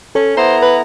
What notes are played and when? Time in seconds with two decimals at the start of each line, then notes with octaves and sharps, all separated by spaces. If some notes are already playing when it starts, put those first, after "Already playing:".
0.15 C#4 A4
0.37 B3 E4 C5 A#5
0.62 B4